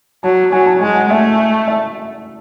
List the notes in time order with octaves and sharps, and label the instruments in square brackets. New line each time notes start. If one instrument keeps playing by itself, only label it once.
[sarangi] F#3 [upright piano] A5
[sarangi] F#3 [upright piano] G#5
[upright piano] A5
[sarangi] G#3 [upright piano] G#5
[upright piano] F#5
[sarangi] A3 [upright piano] E5
[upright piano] E5